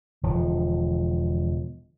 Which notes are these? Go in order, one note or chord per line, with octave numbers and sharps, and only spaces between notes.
E1 D3 F3